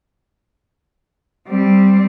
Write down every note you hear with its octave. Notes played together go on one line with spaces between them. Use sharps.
G3 C4